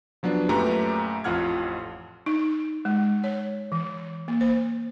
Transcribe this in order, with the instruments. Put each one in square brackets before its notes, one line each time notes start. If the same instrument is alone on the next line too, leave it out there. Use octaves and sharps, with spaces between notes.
[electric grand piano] F3 F#3 B3 D4
F#2 A#2 A3 G4 B4 A#5
A1 F2 F4 F#5 F6 G#6
[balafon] D#4
G#3
C#5
E3
A#3
C5